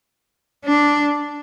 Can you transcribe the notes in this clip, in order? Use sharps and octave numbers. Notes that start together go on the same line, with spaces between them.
D4